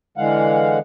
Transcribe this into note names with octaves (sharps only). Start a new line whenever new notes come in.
D3 E3 G#3 F5 F#5